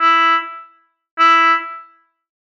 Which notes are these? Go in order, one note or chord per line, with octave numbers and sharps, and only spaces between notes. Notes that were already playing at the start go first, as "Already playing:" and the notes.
E4
E4